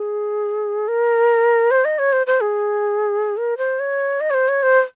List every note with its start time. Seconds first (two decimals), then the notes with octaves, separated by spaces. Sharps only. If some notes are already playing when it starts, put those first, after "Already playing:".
Already playing: G#4
0.88 A#4
1.71 C5
1.85 D#5
1.99 C#5
2.13 C5
2.27 C5
2.41 G#4
3.37 A#4
3.58 C5
3.80 C#5
4.21 D#5
4.30 C#5
4.34 C5
4.48 C#5
4.63 C5